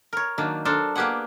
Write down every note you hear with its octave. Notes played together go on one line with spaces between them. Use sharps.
A#4 C#5
D#3 F#3 A#3 D4
D4 A4 A#4 C5
A#3 B3 G4 G#4 F#5